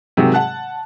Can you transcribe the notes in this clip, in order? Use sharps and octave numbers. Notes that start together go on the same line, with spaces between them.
C3 D#3 F#3 G#3 A#3
F#5 A5 F#6